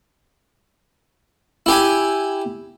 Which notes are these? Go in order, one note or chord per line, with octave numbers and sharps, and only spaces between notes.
E4 G4 G#5